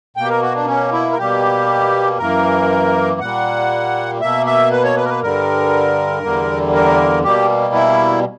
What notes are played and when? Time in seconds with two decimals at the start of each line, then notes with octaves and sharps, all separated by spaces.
0.17 B2 A#3 G5
0.24 G4
0.29 A#4
0.42 F#4
0.55 D4
0.67 C#4
0.92 E4
1.12 A#4
1.18 B2 G3 A#3 G4
2.18 F#2 E3 A#3 A#4
3.20 A#2 G3 A#3 F#5
4.21 B2 A#3 E5
4.46 E5
4.72 B4
4.84 C#5
4.96 B4
5.05 A#4
5.09 B4
5.22 G2 D3 G3 A#4
6.23 E2 D3 G3 A#3
6.74 A#4
7.24 B2 G3 A#3 G4
7.74 E4